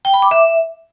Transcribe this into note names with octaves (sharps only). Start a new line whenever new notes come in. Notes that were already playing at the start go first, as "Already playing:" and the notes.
G5
B5
D6
E5